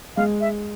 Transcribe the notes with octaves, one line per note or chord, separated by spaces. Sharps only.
G#3 F5
E5